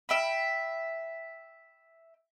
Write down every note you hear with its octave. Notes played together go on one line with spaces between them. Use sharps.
E5 G5 B5